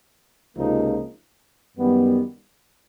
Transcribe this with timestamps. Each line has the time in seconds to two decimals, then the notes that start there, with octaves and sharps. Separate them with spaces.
0.56 C#2 C3 F3 A#3 D#4
1.77 F#2 D#3 G3 B3